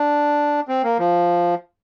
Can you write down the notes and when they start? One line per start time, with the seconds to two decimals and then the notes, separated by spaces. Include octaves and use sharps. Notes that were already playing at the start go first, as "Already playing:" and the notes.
Already playing: D4
0.68 C4
0.84 A#3
0.99 F3